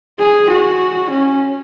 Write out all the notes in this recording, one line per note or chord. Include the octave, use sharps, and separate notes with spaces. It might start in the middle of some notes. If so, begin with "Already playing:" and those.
G#4
F#4
C#4